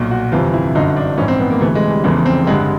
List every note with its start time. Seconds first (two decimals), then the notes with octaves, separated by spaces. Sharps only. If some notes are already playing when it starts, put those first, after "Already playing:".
Already playing: B1 A#2
0.11 F#4
0.32 G1 F2 C3 E3 F4
0.54 E4
0.75 G1 F#2 D3 D#4
0.97 D4
1.18 A#1 G#2 E3 C#4
1.28 C4
1.40 B3
1.50 A#3
1.60 D2 C3 E3 A3
1.75 G#3
1.90 G3
2.04 F1 E2 C#3 E3 G#3
2.26 C4
2.47 A1 G2 D3 G#3